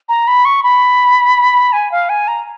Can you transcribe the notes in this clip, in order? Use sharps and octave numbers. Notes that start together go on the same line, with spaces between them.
A#5
B5
C#6
B5
G#5
F5
G#5
A#5